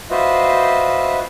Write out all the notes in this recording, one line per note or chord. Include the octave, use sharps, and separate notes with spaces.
F4 F#4 B4 C5 D#5 E5